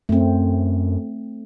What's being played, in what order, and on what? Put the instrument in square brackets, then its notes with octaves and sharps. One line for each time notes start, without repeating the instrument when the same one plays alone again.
[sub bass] F#2 [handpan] A3 C4